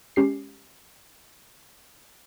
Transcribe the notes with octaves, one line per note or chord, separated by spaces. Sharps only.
G#3 C#4 G4 C7